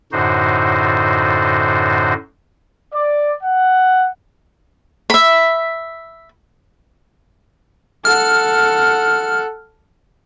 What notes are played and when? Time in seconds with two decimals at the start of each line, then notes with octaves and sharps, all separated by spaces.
0.12 F#2 A2 D3 D#4 F#4 C5
2.94 D5
3.43 F#5
5.10 E5 B5
8.05 A4 F#5 F6